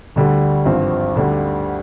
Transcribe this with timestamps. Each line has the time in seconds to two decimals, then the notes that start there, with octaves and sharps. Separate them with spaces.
0.16 D2 D3 G3
0.65 G#1 G2 F3 C4
1.16 D2 D3 G3